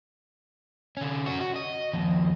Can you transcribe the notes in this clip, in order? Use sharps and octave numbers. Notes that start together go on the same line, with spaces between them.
D3 C#4
C#4 F#4
F#4
D#5
D#2 F3